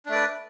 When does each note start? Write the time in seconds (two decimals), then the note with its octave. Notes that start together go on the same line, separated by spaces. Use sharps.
0.06 D4
0.09 A3
0.12 D5
0.15 B4